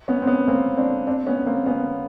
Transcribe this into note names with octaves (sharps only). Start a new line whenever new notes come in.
B3 C#4
C4
B3 C#4
A#3 C4
C4 D4
C4 D4
B3 C#4
A#3 C4
B3 C#4